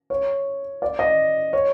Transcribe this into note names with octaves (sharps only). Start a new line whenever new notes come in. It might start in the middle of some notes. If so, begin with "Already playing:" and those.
C#5
D5
D#5
C#5